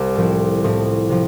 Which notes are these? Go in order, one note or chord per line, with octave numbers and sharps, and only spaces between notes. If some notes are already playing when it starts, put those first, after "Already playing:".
Already playing: C2 C3
A2 F3 C4
A2 F3 C4
C3 F3